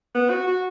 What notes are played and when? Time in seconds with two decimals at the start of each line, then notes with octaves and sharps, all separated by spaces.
0.15 B3
0.30 F#4
0.47 F#4